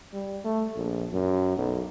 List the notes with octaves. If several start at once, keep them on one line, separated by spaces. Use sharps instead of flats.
G3
A3
A#1
F#2
B1